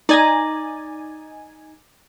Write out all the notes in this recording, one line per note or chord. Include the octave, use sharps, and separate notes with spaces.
D#4 D5 G#5 A#5